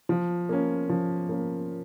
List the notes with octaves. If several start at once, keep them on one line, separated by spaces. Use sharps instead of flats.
F3
A#3 C#4
F3
A#3 C#4